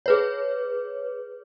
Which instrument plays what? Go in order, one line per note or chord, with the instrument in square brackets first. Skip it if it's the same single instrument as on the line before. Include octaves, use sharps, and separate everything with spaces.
[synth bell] G#4 B4 C#5